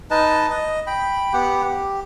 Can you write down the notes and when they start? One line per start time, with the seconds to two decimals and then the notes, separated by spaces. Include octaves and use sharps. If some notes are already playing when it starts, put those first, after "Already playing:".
0.11 D#4 B4 D#5 A5
0.50 D#5
0.87 G5 B5
1.33 B3 G4 F#5
1.64 G4